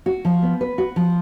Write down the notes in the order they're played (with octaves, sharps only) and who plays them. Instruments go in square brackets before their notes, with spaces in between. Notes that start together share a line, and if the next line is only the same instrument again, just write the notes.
[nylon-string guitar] F#4
F3
B3
B4
F#4
F3